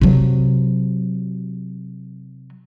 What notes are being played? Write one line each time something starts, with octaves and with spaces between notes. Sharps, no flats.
C3 F#3